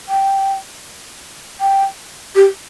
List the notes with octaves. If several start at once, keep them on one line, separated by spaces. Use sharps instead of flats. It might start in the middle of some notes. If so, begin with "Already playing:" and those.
G5
G5
G4